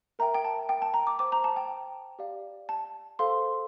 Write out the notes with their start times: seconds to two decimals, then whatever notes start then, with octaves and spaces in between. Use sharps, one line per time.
0.19 A#4 E5 G5 A#5
0.34 G5
0.45 A5
0.69 G5
0.82 A5
0.94 A#5
1.07 D6
1.19 C5 G5 D6
1.32 A#5
1.44 A5
1.56 G5
2.19 G4 D5 F5
2.69 A5
3.19 A4 C5 F5 C6